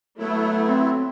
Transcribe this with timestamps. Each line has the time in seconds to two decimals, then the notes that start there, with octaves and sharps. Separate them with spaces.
0.19 F#3 A3 B3 E4
0.68 C4